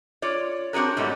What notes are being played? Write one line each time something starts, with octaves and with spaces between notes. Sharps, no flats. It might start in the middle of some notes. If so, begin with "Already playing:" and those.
F4 C#5 D5
C4 D4 F#4 G#4 A#4
G#2 B2 F#3 G3 A3